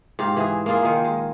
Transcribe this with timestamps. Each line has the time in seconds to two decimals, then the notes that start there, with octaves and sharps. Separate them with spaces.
0.19 G#2 G4 F5
0.37 E3 G#4
0.66 A#3 F4 G#4
0.82 A#2 D#3
1.05 G#3